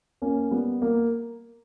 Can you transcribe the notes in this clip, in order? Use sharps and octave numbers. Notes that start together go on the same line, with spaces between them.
A#3 C#4
G3 B3
A#3